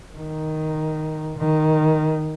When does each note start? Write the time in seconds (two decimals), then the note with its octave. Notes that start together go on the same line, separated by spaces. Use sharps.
0.16 D#3
1.37 D#3